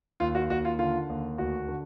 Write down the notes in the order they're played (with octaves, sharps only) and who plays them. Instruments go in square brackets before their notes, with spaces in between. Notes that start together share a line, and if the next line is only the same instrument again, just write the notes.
[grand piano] D#2 F4
F#4
D#2 F#4
F4
D3 F4
D#2
D2 F#4
D3